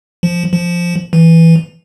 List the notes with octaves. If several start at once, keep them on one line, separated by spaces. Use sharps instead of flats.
F3
F3
E3